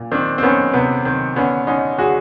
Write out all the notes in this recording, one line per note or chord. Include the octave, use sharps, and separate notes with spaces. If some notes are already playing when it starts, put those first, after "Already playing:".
Already playing: A#2
D#3 C4 D4
C4
D#3 B3 C#4
C3 B3
D#3 C4
D3 B3 C#4
D3 C#4 D#4
D3 F#4 G#4